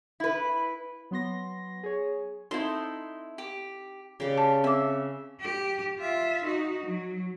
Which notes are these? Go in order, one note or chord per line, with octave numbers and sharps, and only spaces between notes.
E4 B4
F#3 B3 C6 A#6
G#4 C#5
C4 D#4 E4 A4 C6
G4
C#3 G4 D5
A5
C4 E5 D6
G4
F4 E5
D#4 F#4
F#3